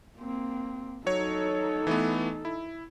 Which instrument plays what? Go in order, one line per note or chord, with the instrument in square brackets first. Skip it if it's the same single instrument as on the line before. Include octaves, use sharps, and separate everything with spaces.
[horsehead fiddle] A#3 C4
[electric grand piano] F#3 C#5 [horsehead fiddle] D#4 A4
[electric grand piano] E3 A3 B3
E4